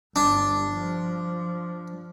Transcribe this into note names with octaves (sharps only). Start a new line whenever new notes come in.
G1 G3 D4
F3